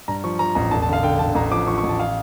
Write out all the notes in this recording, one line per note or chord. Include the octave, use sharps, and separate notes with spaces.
G2 A#5
F3 C#6
F3 A#5
A1 A#5
E1 A5
A5
D3
F5
D3 G5
D3 A5
A1 A#5
F3 D6
F3 C#6
C#6
A1
A5
F5